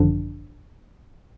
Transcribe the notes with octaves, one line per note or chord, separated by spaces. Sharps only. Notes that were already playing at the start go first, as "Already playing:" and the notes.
Already playing: G#1 F#2 D3 F3 D4